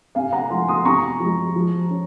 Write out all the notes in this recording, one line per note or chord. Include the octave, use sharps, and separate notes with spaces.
C3 F5 G#5
F#5 A#5
F3 G#3 G#5 C6
C6 D#6
C3 A#5 C#6
F3 G#3
F3
C#4